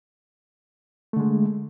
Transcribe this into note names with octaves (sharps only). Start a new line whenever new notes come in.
D3 G#3 A3